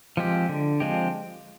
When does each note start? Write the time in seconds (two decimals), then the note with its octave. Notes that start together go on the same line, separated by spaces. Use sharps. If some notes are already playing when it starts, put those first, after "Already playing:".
0.17 F3 G#3 C4 G4
0.49 D3
0.80 F3 G#3 C4 G4